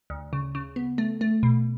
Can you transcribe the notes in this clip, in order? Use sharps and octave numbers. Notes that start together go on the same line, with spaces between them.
D2
C#3
C#3
B3
A3
A3
B2